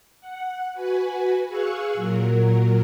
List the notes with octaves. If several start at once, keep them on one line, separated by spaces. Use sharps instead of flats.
F#5
F#4 B4 G#5
G#4 F5 C#6 E6 F#6
A#2 F#3 A#4